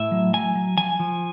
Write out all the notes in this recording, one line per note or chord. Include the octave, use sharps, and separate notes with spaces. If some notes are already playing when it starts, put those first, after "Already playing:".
Already playing: A2 E5
F#3
F#3 G#5
F#3
F3 G#5
F3